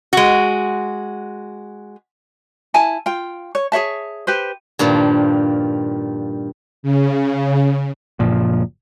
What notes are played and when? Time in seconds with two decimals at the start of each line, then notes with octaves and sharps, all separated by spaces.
0.13 G#3 F#4
2.74 E4 G#5 A5
3.06 F4 G5
3.55 C#5
3.72 G#4 C#5 E5 A5
4.27 G4 B4 C5
4.79 G2 A#2 D#3 F3
6.83 C#3
8.19 F#1 A#2 F3